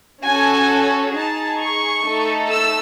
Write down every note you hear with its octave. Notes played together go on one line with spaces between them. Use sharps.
C#4 F#4 A4 G#5
D#4 G#4 A5
C#6
A3 D#4 A4
E6